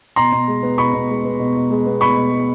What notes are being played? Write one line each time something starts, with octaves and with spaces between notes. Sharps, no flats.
B2 A#5 C6
B2
G#3
B3
B2 B5 C#6
B2
G#3
B3
B2
B2
G#3
B3
B2 B5 C#6
B2
G#3